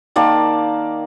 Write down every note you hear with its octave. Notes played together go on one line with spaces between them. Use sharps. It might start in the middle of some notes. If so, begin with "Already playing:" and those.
D#3 A#3 D5 A5